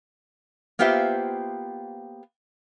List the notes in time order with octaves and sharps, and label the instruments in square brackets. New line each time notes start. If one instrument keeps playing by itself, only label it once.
[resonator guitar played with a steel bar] A#3 B3 F4 G4 C5 E5